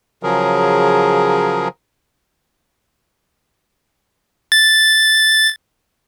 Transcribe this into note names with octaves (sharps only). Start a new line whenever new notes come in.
C#3 F3 F#3 G#4 A#4
A6